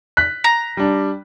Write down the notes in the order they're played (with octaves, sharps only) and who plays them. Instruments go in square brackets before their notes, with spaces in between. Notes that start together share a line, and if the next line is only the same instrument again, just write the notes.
[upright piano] F#6 B6
[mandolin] A#5
[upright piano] G3 D4